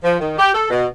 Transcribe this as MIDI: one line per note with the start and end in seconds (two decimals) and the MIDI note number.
0.03 0.16 53
0.19 0.37 51
0.39 0.52 67
0.54 0.69 69
0.70 0.86 47